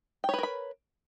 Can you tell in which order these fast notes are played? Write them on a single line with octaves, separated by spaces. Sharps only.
G5 C#5 B4 A#4 B5